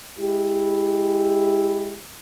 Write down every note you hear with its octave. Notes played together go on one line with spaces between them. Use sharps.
G#3 E4 G4